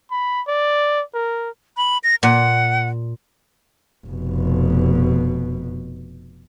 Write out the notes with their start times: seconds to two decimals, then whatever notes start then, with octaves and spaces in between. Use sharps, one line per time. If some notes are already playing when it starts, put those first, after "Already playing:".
0.11 B5
0.48 D5
1.14 A#4
1.77 B5
2.04 A#6
2.23 A#2 F#5
4.07 F1 B2